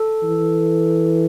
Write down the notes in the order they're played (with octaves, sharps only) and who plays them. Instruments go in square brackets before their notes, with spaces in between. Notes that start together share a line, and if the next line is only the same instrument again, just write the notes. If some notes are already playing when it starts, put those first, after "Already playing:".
Already playing: [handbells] A4
[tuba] E3